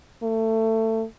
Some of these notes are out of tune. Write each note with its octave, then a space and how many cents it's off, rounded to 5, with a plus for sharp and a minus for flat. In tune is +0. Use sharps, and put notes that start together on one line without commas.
A3 +20